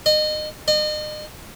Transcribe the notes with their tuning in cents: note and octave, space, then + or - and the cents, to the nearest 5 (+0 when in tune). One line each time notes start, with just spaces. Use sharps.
D#5 -30
D#5 -40